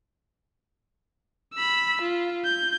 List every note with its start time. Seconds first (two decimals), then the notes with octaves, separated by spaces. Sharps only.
1.54 B5 E6
2.01 F4
2.45 G6